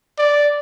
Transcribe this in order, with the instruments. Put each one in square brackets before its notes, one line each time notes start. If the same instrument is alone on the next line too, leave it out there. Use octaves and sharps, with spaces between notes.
[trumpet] D5